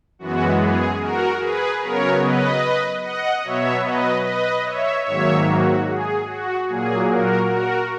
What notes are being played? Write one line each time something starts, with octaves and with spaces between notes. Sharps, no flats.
F#2 E3 G#3 B3 F#4
G#4
F#4 A#4
G#4 B4
C#3 F#3 B3 A#4 C#5
B4 D#5
D#5 F#5
B2 F#3 B3 C#5 E5
B4 D#5
B4 D#5
C#5 E5
G#2 D#3 F#3 A#3 C#5 E5
F#4
G#4
F#4
A#2 F#3 A#3 G#4
F#4 A#4
F#4 A#4